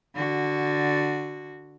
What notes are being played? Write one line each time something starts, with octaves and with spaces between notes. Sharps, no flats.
D3 F#4